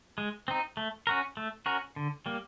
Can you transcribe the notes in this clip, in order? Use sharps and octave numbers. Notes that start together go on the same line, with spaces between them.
G#3
C4 D#4
A3
C#4 F#4 A#4
A3
C#4 F#4 A#4
D3
G3 A#3